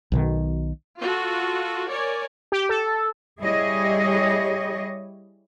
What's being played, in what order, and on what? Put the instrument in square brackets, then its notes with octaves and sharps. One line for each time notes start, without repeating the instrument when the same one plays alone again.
[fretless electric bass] B1 B2 D#3
[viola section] F4 F#4 A4
A#4 C#5 D5 G#5
[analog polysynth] G4
A4
[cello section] G3 E4 G4 G#4 C#5 D#5